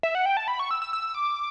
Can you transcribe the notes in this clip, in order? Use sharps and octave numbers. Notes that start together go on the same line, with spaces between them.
E5
F#5
G5
A5
B5
C#6
E6
E6
E6
D6